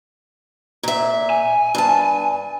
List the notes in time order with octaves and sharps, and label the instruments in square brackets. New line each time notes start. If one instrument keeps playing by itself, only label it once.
[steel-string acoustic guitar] A#2 E5
[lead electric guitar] G#5
[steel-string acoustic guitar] G2 A5